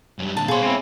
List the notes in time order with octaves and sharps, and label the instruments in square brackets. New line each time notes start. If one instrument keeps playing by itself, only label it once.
[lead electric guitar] F#2 G3
[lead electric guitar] A#2 D3 [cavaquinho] A5
[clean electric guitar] B2 C5 [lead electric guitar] B3 F5 [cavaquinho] G#4 C#5
[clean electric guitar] C4 C#4 E4